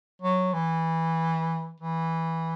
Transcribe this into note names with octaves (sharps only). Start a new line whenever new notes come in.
F#3
E3
E3